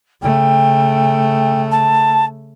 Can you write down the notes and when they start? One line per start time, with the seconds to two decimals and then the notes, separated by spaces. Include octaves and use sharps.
0.21 C#3 A3 G5
1.71 A5